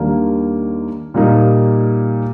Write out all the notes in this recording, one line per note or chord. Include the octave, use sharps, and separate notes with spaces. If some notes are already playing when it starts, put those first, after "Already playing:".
Already playing: D#2 D#3 G3 A#3 D4
A#2 G3 A#3 D#4